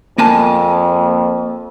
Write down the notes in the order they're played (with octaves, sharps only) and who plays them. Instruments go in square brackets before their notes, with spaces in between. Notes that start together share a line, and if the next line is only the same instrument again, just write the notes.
[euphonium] F2 [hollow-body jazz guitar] A#3 G#5 A5